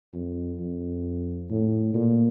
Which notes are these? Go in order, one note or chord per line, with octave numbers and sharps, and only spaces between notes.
F2
F2
A2
A#2